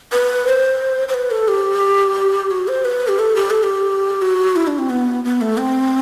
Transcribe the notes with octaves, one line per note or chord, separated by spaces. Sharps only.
B4
C5
C5
B4
A4
G4
F#4
C5
B4
G4
A4
G4
A4
G4
F#4
E4
D4
C4
B3
B3
A3
C4